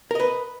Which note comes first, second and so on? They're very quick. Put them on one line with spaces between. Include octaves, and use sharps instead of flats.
A#4 D#5 B4